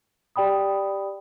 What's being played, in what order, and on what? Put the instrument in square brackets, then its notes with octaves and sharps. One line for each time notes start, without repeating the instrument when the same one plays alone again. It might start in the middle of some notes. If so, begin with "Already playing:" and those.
[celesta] G4 D5 G5 B5 D#6